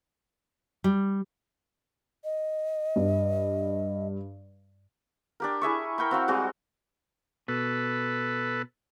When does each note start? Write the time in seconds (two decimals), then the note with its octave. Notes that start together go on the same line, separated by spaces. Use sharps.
0.84 G3
2.24 D#5
2.96 G2
5.40 D4 G4 A#4
5.62 E4 G#4 E5 C#6
5.98 A#4 G5 B5 C#6
6.11 C4 F#4 F5 A#5
6.28 G3 G#3 C4 F#4
7.48 B2 A4 B4